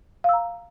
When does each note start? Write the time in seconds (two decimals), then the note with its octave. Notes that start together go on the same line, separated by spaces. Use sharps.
0.24 F5
0.29 E6
0.33 A#5